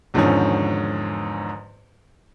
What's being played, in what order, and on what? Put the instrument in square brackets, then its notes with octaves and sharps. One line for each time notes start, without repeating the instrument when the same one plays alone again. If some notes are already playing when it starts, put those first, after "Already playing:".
[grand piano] E2 G#2 D3 D#3 F3 C#4